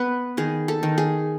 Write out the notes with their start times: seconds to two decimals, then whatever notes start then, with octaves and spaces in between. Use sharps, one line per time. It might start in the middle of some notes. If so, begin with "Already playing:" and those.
Already playing: B3 B4
0.37 D#3 G#4
0.68 A4
0.83 D#3
0.98 G#4